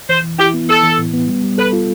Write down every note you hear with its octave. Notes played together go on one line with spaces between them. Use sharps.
E3 C5
E3
E4 G4
B3
B3 A4
E3
A2
B3
G3
G3
A4 B4
F4